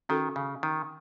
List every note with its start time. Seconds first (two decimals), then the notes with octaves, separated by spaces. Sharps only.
0.09 D#3 C#4 F#4 A4
0.36 C#3
0.63 D#3